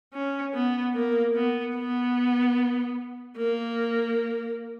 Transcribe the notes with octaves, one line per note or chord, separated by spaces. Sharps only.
C#4
B3
A#3
B3
B3
A#3